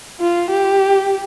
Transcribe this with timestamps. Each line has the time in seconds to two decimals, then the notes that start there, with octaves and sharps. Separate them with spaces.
0.21 F4
0.51 G4